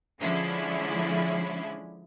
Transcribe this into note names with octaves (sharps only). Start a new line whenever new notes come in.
D3 F3 G#3 C#4 E4